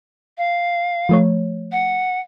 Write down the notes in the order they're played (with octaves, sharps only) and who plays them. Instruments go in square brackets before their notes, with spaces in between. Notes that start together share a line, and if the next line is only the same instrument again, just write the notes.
[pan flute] F5
[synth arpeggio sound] F3 A3 C#5
[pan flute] F#5